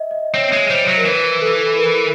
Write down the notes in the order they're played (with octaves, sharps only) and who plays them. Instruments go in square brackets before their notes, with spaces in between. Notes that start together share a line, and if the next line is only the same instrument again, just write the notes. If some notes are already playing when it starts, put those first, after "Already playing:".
Already playing: [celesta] D#5 E5
D#5
[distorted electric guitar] C4 [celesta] C#5
[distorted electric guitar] G#3
[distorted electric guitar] G3 [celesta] C5
[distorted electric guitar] F#3
[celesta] A#4
[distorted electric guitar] E3 [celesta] B4
[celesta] A4
A#4